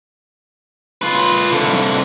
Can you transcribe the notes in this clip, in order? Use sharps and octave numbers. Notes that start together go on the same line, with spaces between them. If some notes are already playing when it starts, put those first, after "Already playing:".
F4 B4
C2 D3